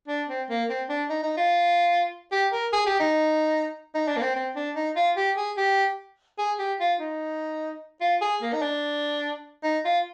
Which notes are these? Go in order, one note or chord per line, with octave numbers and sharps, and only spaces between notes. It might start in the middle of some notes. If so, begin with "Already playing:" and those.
D4
C4
A#3
C4
D4
D#4
D#4
F4
G4
A#4
G#4
G4
D#4
D#4
D4
A#3
C4
C4
D4
D#4
F4
G4
G#4
G4
G#4
G4
F4
D#4
F4
G#4
A#3
D#4
D4
D#4
F4